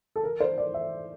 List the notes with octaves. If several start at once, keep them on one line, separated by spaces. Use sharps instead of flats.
A4
A#4
C5
D5
E5